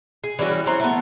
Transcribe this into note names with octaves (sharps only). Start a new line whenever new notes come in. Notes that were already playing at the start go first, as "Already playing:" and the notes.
G#4
E3 G3 C#4 F#4
E3 F#3 C4 A#5
A3 B3